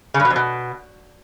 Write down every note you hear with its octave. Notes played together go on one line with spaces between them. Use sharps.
C#3
G2
B2
F2
B2